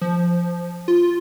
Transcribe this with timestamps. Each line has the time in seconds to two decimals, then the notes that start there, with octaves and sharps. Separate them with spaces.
0.01 F3
0.88 F4